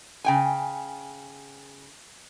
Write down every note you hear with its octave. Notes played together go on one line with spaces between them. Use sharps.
C#3 G5 G#5